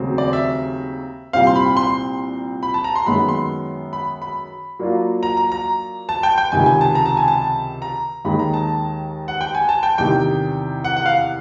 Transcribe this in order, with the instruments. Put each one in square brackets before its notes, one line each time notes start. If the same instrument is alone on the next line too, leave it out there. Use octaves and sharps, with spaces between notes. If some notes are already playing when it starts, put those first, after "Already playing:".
Already playing: [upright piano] D#2 C#3 F#3 A3 C4
[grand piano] D5
E5
[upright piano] C2 A#2 G3 C4 [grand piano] F5
[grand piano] C6
B5
C6
B5
A5
A#5
C6
[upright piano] F#2 D#3 G#3 B3 [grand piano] B5
[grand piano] C6
B5
B5
[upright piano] F#3 A#3 D4 F4
[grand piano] A#5
A#5
A#5
A5
G5
G5
[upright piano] C#2 C3 D#3 [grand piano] G#5
[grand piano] G#5
A5
A#5
A5
G#5
A5
A#5
[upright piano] D#2 D#3 G#3 [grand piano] B5
[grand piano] A#5
A5
F#5
G5
G#5
A5
G5
[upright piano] E2 C3 D#3 [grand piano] G5
[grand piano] F#5
F#5
F5